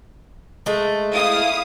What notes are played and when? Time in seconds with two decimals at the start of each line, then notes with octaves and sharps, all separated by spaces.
0.66 G#3 A3
1.14 E4 F5 D#6